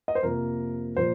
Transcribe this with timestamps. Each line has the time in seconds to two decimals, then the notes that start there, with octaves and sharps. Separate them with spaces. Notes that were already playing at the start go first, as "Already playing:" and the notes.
0.08 D#5
0.15 C5
0.23 F2 C3 F3 A#3 A#4
0.97 A#2 F3 A#3 C5